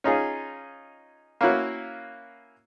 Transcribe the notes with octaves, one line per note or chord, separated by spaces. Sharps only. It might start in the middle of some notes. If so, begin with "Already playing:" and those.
C#4 D#4 F4 G#4
A#3 C#4 E4 F#4